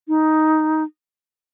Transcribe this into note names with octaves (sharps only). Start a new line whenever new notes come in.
D#4